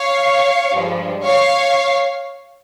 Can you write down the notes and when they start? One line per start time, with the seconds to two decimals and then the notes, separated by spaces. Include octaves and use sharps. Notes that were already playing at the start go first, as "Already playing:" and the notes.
Already playing: C#5 F5
0.75 G2 F3 G#3
1.24 C#5 F5